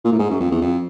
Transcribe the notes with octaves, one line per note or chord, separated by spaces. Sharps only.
A#2
A2
G#2
F#2
F2
E2
F2